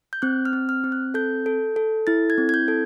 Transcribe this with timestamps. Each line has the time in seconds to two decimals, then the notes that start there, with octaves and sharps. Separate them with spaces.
0.13 G6
0.22 C4 F#6
0.45 F6
0.53 C4
0.69 F6
0.84 C4
0.92 F#6
1.14 A4 G6
1.46 A4
1.76 A4
2.07 E4 A6
2.30 G#6
2.38 C4
2.49 G#6
2.54 G6
2.68 A4